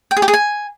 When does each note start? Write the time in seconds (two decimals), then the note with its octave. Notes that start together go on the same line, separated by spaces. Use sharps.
0.11 G5
0.17 G#4
0.22 G4
0.28 G#4
0.34 G#5